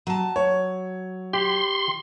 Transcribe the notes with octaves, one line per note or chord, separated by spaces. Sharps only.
F#3 A5
C#5
G4 C6